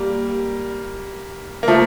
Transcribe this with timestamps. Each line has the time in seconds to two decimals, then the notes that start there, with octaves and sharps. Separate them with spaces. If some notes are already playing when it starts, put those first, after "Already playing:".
Already playing: G3 A#3
1.63 A#3
1.68 F3 A3